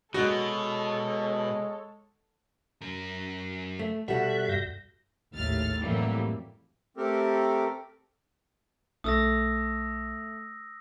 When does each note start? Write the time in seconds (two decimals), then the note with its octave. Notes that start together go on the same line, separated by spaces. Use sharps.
0.14 B2 G#3 F#4 A4 C#5
2.81 F#2 A#4
3.79 A3
4.08 B2 G3 F#4 A4 E5 F#5
4.49 G2 G6 A#6
5.34 G#1 D#2 A2 F6 A6
5.81 F2 A2 E3 F#3 G3 A#3
6.97 A3 C4 G4 A4 A#4
9.04 B1 A3 D#6 E6 A#6